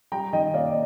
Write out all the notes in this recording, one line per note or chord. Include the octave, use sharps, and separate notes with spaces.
G3 G5 A#5
D#3 D#5 G5
A#3 D5 F5
D#5